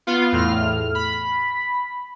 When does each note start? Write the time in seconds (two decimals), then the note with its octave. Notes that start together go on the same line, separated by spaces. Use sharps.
0.07 B3 F4
0.32 E2 A2 F6
0.95 B5